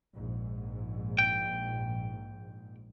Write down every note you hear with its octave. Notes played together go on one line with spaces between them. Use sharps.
A#1 G#2
G5